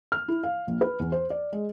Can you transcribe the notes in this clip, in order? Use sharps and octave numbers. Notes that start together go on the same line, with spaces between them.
F6
E4
F5
A#1
B4
E2
C5
D5
G#3